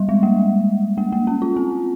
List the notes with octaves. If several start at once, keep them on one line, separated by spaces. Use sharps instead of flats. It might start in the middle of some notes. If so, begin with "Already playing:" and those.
Already playing: G3
G#3
A#3
A#3
A#3
C#4
F4
C4